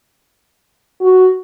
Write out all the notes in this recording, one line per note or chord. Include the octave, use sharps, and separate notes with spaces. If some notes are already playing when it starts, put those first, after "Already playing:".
F#4